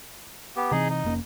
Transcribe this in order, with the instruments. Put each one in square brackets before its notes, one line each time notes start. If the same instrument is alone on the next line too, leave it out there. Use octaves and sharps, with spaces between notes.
[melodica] B3 G4
[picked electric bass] C3 E3 C4 [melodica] D#4 G#4
[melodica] D#4
[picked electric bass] F1 A#3 C#4